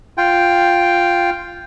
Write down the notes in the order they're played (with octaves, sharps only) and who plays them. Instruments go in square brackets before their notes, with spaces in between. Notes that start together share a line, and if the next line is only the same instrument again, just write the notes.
[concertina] F4 G5